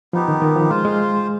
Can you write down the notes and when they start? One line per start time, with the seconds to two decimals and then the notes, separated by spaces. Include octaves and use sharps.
0.13 F3 B3 D#4 G4
0.28 D#3
0.42 D#3
0.56 F3
0.70 G#3 F4 C5 F5
0.85 G#3